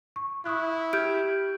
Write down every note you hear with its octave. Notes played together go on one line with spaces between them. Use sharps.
C#6
E4 C#6 D#6 F#6
G4 F6 G6 G#6 D7